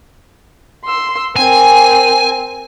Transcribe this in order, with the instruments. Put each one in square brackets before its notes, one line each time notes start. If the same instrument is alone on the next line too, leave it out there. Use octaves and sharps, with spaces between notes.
[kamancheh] C6 E6
[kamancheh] C4 A#4 [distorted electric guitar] G#5